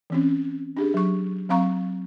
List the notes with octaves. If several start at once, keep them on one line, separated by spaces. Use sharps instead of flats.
E3 C4 C#4
D4 G4 G#4
F#3 C#6
F#3 C4 F5 A#5 C#6